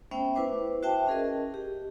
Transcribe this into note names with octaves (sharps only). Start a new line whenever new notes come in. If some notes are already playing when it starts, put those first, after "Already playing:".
A3 B3 C#4 C5 E5 G5
E4 B4 C5 D6
F#4 C5 E5 G5 A5
C#4 G#4 A#4 D#5
G4